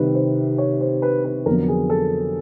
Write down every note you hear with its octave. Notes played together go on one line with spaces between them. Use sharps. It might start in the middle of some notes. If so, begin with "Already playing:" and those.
Already playing: C2 C3 D#3 G3 C4 B4
C5
C#5
C5
B4
B4
F2 D3 F#3 B3 A#4
G#4
A4